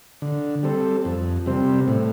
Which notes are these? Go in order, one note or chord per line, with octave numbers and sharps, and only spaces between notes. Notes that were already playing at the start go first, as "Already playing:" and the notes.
D3
G3 C4 A4
F2
C3 G3 C4
A2